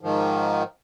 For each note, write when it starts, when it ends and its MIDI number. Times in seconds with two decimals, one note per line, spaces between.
0.01 0.63 44
0.01 0.63 51
0.01 0.63 53